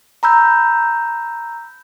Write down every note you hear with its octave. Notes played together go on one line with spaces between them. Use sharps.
A#5 B5 E6 G6